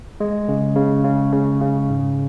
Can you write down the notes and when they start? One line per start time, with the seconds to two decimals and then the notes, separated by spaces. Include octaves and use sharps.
0.20 G#3
0.49 C#3
0.76 C#3
1.04 C#3
1.33 C#3
1.61 C#3
1.89 G#2